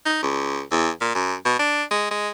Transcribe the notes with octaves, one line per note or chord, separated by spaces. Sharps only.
D#4
C#2
E2
A#2
F#2
B2
D4
G#3
G#3